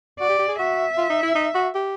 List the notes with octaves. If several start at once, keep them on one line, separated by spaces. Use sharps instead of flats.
F#4 D5
G4
G4
G#4
F#4 E5
F4
D#4
E4
D#4
F#4
G4